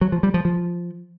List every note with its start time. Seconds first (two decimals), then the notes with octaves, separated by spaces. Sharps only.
0.01 F#3
0.12 F3
0.23 G3
0.34 F3
0.45 F3